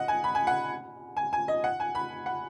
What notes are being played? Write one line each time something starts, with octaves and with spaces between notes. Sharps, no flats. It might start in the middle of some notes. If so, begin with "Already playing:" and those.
Already playing: D#5 F#5
G#5
B5
G#5
F#5
G#5
G#5
D#5
F#5
G#5
B5
F#5